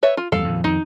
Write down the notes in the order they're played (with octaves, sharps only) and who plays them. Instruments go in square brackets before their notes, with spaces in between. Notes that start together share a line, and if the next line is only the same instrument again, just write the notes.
[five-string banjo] B4 C#5 E5
F4
[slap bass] E2 G2 G3 [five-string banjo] A4 F5
[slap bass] F2 A#2 D#3
[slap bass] F2 D#3 [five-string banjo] D#4